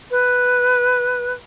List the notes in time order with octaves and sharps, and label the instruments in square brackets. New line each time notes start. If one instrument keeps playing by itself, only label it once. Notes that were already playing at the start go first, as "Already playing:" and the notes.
[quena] B4